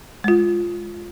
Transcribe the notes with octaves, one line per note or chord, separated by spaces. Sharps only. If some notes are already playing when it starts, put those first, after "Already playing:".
G#3 F4